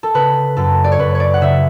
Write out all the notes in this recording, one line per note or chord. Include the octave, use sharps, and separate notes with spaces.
A4
C#3 B4
F#2 A4
D5
C#5
F#2 B4
C#5
D5
F#5
C#3 E5